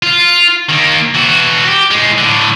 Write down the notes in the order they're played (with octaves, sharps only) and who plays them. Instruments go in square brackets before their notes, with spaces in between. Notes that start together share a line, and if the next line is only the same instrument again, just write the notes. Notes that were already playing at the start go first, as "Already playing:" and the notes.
[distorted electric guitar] F4
D#3 A#3
E3 F#4
F#4 G4
A2 G#3
A2 D3